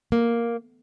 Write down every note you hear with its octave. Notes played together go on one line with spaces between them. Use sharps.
A#3